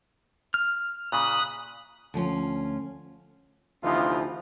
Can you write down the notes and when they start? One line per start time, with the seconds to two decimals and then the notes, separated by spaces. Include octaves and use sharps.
0.54 F6
1.12 A#2 C#3 B5 D#6 F#6
2.14 D2 F3 C#4 F4
3.83 D2 C3 E3 F3 D#4 F4